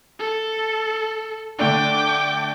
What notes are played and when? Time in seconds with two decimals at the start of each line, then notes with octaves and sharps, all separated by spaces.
0.19 A4
1.59 D3 A3 D4 G5 D6